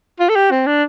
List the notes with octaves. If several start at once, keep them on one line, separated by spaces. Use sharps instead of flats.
F4
A4
G4
C4
D4